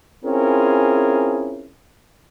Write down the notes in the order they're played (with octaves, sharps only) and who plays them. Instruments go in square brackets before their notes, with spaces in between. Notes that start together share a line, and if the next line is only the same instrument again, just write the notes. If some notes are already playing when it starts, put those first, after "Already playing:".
[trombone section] C4 C#4 E4 F4 G#4 A#4